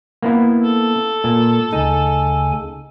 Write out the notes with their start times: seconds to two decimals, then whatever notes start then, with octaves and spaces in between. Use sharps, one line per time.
0.23 A#3 B3 E4
0.63 A4
1.24 A#2
1.72 D2 C#3 D#4 G#5